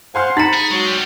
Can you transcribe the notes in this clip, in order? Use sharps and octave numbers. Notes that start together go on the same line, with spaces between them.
C5 F5 F#5 G#5 C6 F6
D#4 A#5 B5 A6 C#7
G#4
F#3 G#3 C#6
G3 G#3